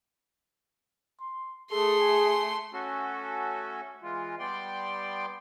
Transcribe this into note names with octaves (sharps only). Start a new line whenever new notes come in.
C6
A3 G#4 A4 C6
G#5
A3 C#4 F#4 A4
E3 G#3 F4
G3 B3 D5 G5 C6